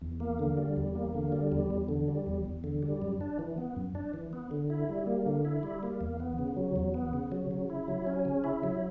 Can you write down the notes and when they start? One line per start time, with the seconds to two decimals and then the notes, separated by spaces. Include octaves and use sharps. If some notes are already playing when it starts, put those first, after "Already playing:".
0.02 E2
0.20 A#3
0.39 D3
0.57 G3
0.76 E2
0.95 A#3
1.14 D3
1.32 G3
1.52 E2
1.70 E2
1.89 D3
2.08 G3
2.26 E2
2.45 E2
2.64 D3
2.83 G3
3.02 F#2
3.21 D4
3.39 E3
3.58 B3
3.76 F#2
3.95 D4
4.14 E3
4.33 B3
4.51 D3
4.70 E4
4.89 G3
5.07 A#3
5.26 D3
5.45 E4
5.63 G3
5.83 A#3
6.01 E2
6.20 B3
6.39 C#3
6.57 F#3
6.76 E2
6.94 B3
7.13 C#3
7.32 F#3
7.51 C#3
7.70 E4
7.88 F#3
8.07 C#4
8.25 C#3
8.44 E4
8.63 F#3